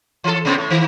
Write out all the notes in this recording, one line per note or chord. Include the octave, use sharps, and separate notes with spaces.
E3 A4
C3 B3 C4
A2
D#3